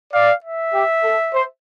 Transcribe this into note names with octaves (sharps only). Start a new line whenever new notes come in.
D5 F5
E5
G4
A4
C5